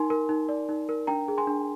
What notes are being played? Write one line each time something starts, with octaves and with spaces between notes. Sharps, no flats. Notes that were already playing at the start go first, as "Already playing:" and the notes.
Already playing: D#4 A#4 G#5 C6
A#4
D#4
D5
D#4
A#4
D4 G5 A#5
G#4
G#5 C6
D4